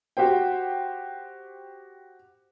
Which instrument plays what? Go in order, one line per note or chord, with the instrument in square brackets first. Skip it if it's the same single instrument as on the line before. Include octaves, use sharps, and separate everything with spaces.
[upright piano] F#4 G4 C5 G5